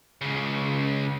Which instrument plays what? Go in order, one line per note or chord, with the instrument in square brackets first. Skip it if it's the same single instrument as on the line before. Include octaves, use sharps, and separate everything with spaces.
[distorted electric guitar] C#2 C#3